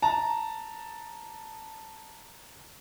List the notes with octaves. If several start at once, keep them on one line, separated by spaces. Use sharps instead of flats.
A5 A#5